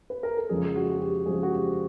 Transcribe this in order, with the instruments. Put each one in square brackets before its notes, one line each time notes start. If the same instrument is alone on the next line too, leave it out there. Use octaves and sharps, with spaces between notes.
[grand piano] B4
A#4
A4
F2 C#3 F3 G#3 G#4
F#4
F#4
G4
F2 C#3 F3 G#3 G#4
F#4
G4